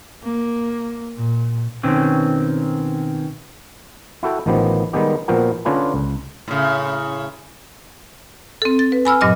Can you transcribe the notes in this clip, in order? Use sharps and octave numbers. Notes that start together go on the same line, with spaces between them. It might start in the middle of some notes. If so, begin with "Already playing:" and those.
A#3
A#2
B2 D#3 C4 C#4
E4 F#4 A4 G5
A1 D#3 F3 B3 G4
D#3 G3 G#3 B3 D#4 G4
A#2 F3 B3 F#4 A#4 G5
D3 C#4 D4 F4 B4 G#5
C#2
A2 C#3
C4 A4
A6
B4
G#5 B5 E6 F6
G2 A#2 F#3 D#5 D6 F6